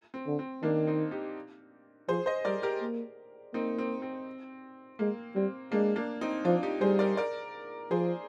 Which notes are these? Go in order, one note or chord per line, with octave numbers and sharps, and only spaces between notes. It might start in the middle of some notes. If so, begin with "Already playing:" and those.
C4
D3
C4
D#3 A#3 D4
C4 D#4
D#4 G4
F3 G#4 C5
C5 D#5
G3 A#4 D5
G4 A#4
A#3
A#3 C4 D#4
C4
C4
G#3 A#3
G3 C4
G#3 A#3 D4
A#3 D4
C4 D#4
F3 D4 F4
D#4 G4
G3 G#4 C5
A#4 D5
A#4 D5
F3 G#4 C5